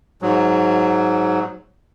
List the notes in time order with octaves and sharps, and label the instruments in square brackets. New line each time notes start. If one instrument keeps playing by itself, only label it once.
[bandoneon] G#2 F#3